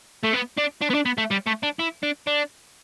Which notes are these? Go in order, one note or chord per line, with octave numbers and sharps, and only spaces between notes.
A3
B3
D4
D4
B3
D4
B3
A3
G3
A3
D4
E4
D4
D4